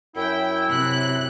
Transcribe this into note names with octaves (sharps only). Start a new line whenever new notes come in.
F#2 E4 G5
C3 F#6